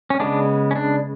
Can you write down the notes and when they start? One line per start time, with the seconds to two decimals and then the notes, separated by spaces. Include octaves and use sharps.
0.10 C#4
0.20 C#3 G#3 B3 D4
0.71 C#4
0.76 D4